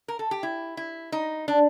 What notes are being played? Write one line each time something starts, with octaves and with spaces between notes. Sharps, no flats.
A#4
A4
G4
E4
E4
D#4
D4